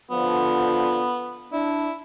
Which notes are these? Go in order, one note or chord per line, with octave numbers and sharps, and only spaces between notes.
D3 F3 B3
D4 E4